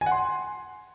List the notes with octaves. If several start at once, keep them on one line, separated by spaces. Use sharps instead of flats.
G#5
F#5
C6